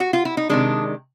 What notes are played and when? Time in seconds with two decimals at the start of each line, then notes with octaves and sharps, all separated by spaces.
0.00 F#4
0.13 F4
0.25 E4
0.37 D#4
0.49 C3 D#3 G#3 D4